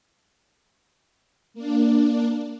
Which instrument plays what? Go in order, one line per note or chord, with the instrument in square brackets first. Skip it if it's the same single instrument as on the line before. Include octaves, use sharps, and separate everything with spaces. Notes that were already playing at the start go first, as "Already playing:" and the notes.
[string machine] A#3 D4